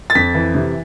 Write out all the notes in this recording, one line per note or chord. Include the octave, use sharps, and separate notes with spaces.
A6
F2 B6
E3
C3